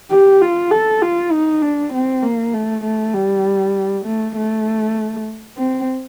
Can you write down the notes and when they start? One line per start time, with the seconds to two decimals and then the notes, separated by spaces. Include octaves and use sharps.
0.11 G4
0.41 F4
0.71 A4
1.02 F4
1.32 D#4
1.62 D4
1.93 C4
2.23 A#3
2.54 A3
2.84 A3
3.14 G3
4.05 A3
4.36 A3
5.57 C4